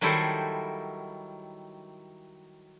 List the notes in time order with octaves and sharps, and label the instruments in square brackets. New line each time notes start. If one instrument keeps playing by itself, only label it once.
[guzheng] D#3 F#3 G3 E4 A4 C5